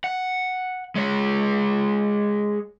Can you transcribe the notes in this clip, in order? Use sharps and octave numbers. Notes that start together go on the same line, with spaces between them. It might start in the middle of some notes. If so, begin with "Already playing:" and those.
F#5
G#3 C#5